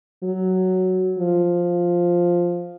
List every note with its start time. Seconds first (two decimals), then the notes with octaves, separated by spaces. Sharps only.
0.23 F#3
1.19 F3